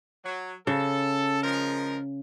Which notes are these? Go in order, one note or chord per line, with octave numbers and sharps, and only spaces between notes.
F#3
C#3 A4
F3 G#3 A#4